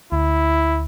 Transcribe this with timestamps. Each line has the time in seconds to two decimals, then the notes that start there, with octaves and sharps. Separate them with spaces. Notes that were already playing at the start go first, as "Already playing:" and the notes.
0.12 D2 E4